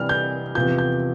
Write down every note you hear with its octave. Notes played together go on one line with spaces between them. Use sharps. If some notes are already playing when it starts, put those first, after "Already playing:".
Already playing: C3 E3 G3 D4 F6
G6
E2 C3 F3 G6
G6